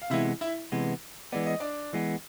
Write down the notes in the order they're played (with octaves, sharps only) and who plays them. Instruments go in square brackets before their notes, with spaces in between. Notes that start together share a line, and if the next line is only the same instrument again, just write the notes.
[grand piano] F5
[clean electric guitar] C3 E3 G#3 B3 [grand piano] E4 E5
[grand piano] E4 E5
[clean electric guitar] C3 E3 G#3 B3
[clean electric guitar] E3 G#3 B3 [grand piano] D5
[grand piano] D#5
D4 D5
[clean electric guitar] E3 G#3 B3